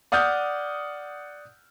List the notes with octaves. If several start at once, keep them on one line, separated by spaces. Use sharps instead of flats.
D5 F#5 D#6 F6 G6